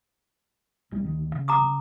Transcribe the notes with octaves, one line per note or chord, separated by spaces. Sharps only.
C2 A#2 G3
D2 D#3
C#3
A#5 D6 D#6
C#3